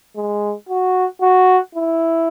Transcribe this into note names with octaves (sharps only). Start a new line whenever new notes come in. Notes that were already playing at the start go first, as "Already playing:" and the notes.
G#3
F#4
F#4
E4